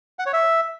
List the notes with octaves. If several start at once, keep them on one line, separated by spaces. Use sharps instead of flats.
F#5
C#5
E5